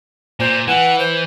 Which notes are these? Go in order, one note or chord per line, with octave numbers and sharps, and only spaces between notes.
A#2 C5
E3 F#5
C5